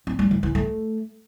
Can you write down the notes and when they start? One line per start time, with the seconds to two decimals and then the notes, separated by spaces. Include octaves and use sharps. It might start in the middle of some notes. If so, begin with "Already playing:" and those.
0.07 C4
0.19 G3
0.31 E3
0.43 E3
0.55 A3